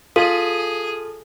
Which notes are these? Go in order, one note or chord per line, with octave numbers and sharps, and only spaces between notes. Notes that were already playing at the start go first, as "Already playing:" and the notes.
F4 G#4 A4